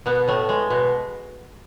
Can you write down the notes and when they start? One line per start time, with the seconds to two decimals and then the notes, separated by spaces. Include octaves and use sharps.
0.06 B2 B3
0.28 A2 A3
0.49 G#3
0.70 B2